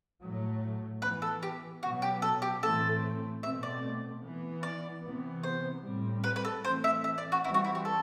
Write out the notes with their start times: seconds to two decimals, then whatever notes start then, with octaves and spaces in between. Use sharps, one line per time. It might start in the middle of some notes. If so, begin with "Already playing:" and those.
0.22 A2 F#3 A3
1.02 E3 B3 B4
1.22 A4
1.43 G4
1.82 B2 F#3 B3 F#4
2.02 G4
2.22 A4
2.42 G4
2.62 A2 E3 A3 C4 A4
3.43 B2 A3 C4 E5
3.63 D5
4.24 E3 B3
4.63 D5
5.03 C3 E3 B3
5.43 C5
5.84 A2 G3 C4
6.24 B4
6.36 B4
6.45 A4
6.64 E3 A3 C4 C5
6.84 E5
7.04 E5
7.18 D5
7.32 F#4
7.44 E3 G3 C4 E4
7.54 F#4
7.64 E4
7.75 F#4
7.85 A4